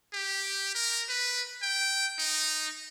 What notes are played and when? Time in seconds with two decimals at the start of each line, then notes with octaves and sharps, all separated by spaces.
0.13 G4
0.75 A#4
1.09 B4
1.62 G5
2.19 D#4